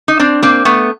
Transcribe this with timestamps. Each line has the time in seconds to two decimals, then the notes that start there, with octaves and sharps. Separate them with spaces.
0.08 D#4
0.19 C4 D4
0.42 A#3 C4
0.65 A3 B3